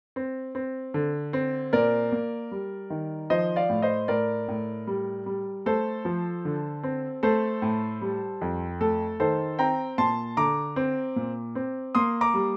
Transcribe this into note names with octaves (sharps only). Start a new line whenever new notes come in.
C4
C4
D3
C4
A#2 A#4 D5
A#3
G3
D#3
F3 C5 D#5
D5 F5
A2
C5 D#5
A2 A#4 D5
A2
G3
G3
A3 A4 C5
F3
D3
C4
A3 A4 C5
A2
G3
F2
A3 A4
D#3 A4 C5
C4 G5 A#5
A#2 A5 C6
D3 A#5 D6
C4
A#2
C4
A#3 C6 D#6
A#5 D6
G3